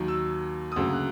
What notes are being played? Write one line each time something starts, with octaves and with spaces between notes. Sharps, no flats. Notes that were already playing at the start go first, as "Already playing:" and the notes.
Already playing: D#2 D#3 F#3
E6
D#6
D2 C#3 F#3 A#3 E6
F#6